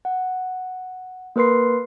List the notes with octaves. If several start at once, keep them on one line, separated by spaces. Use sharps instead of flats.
F#5
A#3 A#4 B4 C6 C7